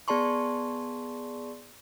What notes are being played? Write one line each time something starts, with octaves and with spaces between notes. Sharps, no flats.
B3 G#4 D5 A5 C6 C#6